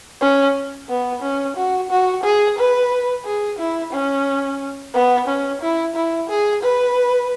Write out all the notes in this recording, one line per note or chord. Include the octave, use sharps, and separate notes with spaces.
C#4
B3
C#4
F#4
F#4
G#4
B4
G#4
E4
C#4
B3
C#4
E4
E4
G#4
B4